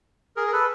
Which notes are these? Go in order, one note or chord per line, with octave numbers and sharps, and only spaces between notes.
G#4 A#4
A#4
A4 B4